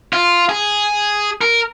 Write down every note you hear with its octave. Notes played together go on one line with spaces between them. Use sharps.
F4
G#4
A#4